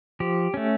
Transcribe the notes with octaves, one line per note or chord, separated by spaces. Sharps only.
F3 G4
A3 C#4